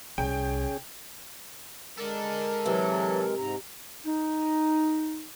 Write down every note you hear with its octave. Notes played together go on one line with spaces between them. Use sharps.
C2 C#4 G#4 G5
G#3 A4 A#4 D5
C3 E3 F#3
G#2 A#5
D#4